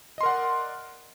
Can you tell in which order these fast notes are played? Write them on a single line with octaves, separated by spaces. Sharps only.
D#5 C6 A#4 F#5 D5